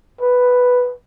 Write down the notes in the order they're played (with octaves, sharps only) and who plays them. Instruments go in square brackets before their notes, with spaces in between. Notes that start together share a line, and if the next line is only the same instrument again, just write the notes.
[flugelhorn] B4